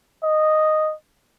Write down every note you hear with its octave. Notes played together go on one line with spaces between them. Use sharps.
D#5